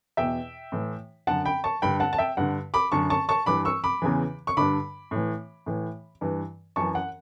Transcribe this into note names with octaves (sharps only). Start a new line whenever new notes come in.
E2 B2 E5 G5
A2 E3
F#2 D3 F#5 A5
G5 B5
A5 C#6
G2 D3 G5 B5
F#5 A5
A5
E5 G5
G2 D3 F#5
B5 D6
F#2 D3 A5 C#6
A5 C#6
A5 C#6
G2 E3 B5 D6
C#6 E6
B5 D6
E2 C#3 E3
C#6
G2 D3 B5 D6
A2 E3
A2 E3
G2 E3
F#2 E3 A5 C#6
F#5